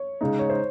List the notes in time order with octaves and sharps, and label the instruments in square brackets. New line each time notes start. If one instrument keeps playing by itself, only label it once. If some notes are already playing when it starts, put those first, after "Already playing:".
Already playing: [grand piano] C#5
[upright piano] C#3 G#3 D#4
[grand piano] C#5
C5